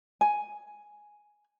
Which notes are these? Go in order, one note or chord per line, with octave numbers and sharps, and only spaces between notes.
G#5